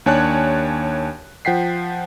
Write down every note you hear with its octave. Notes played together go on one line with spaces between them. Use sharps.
D#2 D4 C#5 G#5 A5 F#6
F3 F#5 G5 B6 C7